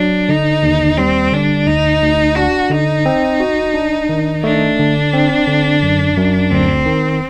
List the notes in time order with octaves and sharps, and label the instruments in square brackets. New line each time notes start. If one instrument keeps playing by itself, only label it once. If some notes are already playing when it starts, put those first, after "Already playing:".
Already playing: [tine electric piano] F#3 [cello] D4
[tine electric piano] D3 [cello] D#4
[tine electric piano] D#2
[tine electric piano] G3 [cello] C4
[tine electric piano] D3 [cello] D4
[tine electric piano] D2 [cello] D#4
[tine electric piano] D2
[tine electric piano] D4 [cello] F#4
[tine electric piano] D3 [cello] D#4
[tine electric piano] C4
F#4
D4
D#3
[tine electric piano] A3 [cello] D4
[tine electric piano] D3
C4
D3
F#2
F#2
[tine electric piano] D2 [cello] C4
[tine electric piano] D#3